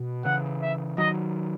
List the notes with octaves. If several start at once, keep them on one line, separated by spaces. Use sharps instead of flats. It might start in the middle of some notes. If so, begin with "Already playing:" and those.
Already playing: B2
C#3 E3 F#5
E5
D#3 F#3 D#5